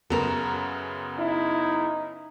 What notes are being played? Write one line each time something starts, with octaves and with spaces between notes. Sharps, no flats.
F#2 C#3 B3 A4 A#4
D#4 E4